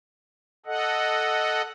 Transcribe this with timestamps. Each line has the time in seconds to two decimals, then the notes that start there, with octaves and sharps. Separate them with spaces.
0.66 A4 D#5 F#5